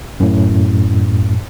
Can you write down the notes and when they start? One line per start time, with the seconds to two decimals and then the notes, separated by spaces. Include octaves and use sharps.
0.20 F#2 A2